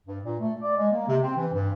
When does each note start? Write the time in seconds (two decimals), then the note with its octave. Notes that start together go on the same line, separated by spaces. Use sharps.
0.07 G2
0.24 A#2
0.39 A3
0.61 D5
0.77 G#3
0.91 A#3
1.08 C3
1.21 C4
1.36 E3
1.53 G2